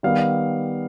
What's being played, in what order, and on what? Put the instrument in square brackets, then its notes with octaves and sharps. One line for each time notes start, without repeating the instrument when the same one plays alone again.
[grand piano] D#3 G3 B3 F5